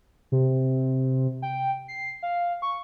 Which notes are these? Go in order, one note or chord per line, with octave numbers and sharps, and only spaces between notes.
C3
G5
C7
F5
C#6